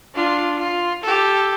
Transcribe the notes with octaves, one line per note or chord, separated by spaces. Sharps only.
D4 F4
F4
G4 A4